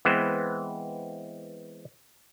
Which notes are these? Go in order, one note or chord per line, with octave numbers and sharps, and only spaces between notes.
E3 G#3 B3 C4 C5